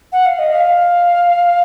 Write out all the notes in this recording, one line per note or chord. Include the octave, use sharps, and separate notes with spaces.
F#5
F5
D#5
F5